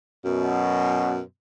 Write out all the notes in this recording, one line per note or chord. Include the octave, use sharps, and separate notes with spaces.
F#2 B2